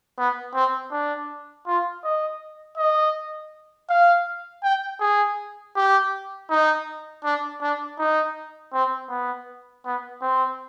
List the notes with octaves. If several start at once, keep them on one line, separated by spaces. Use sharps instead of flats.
B3
C4
D4
F4
D#5
D#5
F5
G5
G#4
G4
D#4
D4
D4
D#4
C4
B3
B3
C4